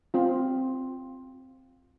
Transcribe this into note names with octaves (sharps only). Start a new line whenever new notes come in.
C4 F4